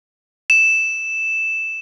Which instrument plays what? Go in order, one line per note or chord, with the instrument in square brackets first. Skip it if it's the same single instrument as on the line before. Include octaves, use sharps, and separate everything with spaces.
[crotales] E7